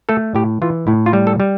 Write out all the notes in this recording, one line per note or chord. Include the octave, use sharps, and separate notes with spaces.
A3 A4
A2 G4
E3 F4
A2 E4
F4
G3
A4
G3